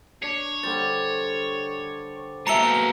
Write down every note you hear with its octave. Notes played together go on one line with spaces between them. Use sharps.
D4 C#5
D3 G3 C5 A6
B2 G#3 A#3 E5 A5 A#5 C#7 G7